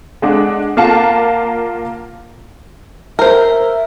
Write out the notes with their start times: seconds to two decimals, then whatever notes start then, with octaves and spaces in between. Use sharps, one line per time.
0.22 G#3 D4 F#5
0.77 A#3 F4 A#4 F5 F#5 A5
3.19 A#4 C5 E5